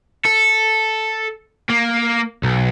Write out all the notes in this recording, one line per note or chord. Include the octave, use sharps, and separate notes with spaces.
A4
A#3
B1